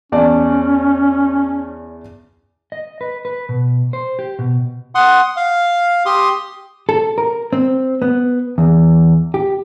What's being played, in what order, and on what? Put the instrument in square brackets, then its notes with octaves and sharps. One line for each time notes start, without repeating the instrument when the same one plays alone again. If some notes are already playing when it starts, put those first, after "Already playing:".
[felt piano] E2 D5 A5 [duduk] C#4
[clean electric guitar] D#5
B4
B4
B2
C5
G4
B2
[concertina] F#5 C6 D#6
F5
G4 C6 D#6
[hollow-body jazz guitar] A4
A#4
C4
B3
E2
G4